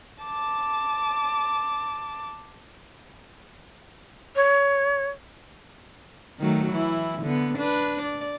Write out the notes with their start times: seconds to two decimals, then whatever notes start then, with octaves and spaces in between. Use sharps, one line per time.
0.24 A5 D6
4.36 C#5
6.40 D#3 F#3 A3
6.72 E3 E4
7.22 D3 B3
7.58 D4 B4
8.02 D5